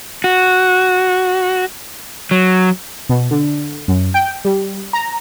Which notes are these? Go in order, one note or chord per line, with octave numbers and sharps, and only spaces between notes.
F#4
F#3
B2
D3
F#2
G5
G3
A#5